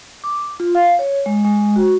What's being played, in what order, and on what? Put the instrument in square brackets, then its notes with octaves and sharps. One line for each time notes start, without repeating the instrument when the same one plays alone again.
[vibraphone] D6
F4
F5
C#5
G#3
G#3
F#4